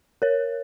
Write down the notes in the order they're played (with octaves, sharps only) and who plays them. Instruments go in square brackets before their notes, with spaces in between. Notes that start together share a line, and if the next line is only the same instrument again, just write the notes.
[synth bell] A#4 C#5